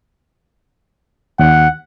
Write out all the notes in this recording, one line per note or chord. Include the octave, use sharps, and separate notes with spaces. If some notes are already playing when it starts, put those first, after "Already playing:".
D#2 F#5